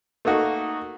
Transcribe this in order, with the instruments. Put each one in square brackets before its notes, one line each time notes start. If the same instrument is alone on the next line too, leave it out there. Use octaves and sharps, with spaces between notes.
[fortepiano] A3 A#3 D#4 F#4